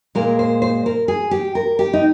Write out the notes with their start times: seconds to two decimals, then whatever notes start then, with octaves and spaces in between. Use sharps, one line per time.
0.15 A#2 G#3 A#4
0.39 C5
0.62 C5
0.86 A#4
1.08 G#4
1.31 G4
1.55 A#4
1.79 G4
1.93 D#4